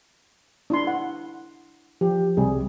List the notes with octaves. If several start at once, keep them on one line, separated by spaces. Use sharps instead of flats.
D4 E4 C6
F#5
F3 G4
C2 C3 G3 G#4